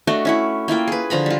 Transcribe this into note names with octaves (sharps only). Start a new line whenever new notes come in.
A3 D4 F#4 D#5
C#4 E4 F#5
A#3 E4 F4 G5
G#4 B4
D3 F3 A#5 B5
G3 F4